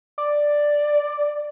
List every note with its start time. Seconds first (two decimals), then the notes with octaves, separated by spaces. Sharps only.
0.18 D5